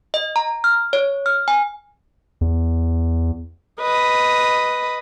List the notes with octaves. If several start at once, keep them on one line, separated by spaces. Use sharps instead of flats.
D#5
A#5
F6
C#5
F6
G#5
E2
B4 D#5